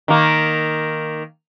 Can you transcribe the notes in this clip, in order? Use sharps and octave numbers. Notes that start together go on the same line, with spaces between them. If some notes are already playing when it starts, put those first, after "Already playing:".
D#3 A#3